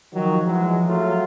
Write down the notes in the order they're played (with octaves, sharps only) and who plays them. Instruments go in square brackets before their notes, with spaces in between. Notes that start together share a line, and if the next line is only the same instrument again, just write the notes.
[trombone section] D#3 F#3 [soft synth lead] F3
[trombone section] E3 F#3 G#3
F#3 A3 F4